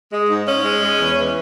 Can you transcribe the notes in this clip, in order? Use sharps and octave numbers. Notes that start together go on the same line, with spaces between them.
G#3
G#2
G#2 C#4
G#3
G#3
E2
E3